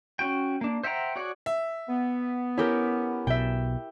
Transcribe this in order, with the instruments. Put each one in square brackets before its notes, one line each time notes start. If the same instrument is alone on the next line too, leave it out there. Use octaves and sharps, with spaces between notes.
[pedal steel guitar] C#4 F#4 G5
A#3 D4
C5 E5 F#5 G5 A#5
F#4 G#4 C#5 D5 F#5
[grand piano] E5
[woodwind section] B3
[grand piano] C#4 [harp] E4 G4 A#4
[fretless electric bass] B1 B2 [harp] E5 G5